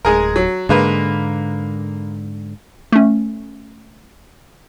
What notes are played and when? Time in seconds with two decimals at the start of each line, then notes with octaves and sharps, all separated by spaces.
0.05 D1 G#3 G#4 A#4
0.36 F#3
0.69 G#2 D3 G#3 A#3 B4
2.92 A3 C#4